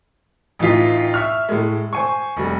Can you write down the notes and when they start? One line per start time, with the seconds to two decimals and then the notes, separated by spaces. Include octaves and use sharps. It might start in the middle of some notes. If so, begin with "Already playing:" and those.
0.59 A1 E3 D#4 F4 B6
1.14 E5 C#6 F6
1.49 A2 G#3
1.93 C5 G#5 C#6
2.37 F1 G3